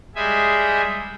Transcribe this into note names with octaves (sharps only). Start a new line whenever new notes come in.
G3 G#3 G#4 E5 G#5